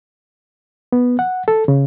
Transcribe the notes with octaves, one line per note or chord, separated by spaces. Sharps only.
B3
F#5
A4
C#3